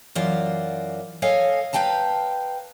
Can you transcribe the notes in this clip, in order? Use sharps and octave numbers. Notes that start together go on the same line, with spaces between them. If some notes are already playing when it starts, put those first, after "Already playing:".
F#2 E3 F4 F#4 D5
A4 C#5 D#5 F5 G#5
B4 D#5 F5 G5 A5 A#5